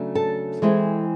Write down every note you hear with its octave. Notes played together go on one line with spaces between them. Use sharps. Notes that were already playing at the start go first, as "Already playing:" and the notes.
Already playing: C#3 F#3 A3 D4
A4 A5
E3 G#3 C4 E4